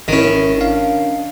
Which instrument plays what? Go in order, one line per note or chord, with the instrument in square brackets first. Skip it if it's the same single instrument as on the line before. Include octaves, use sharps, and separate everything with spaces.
[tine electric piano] G#1 E4 [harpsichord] D#3 C#4
[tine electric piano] D4 F5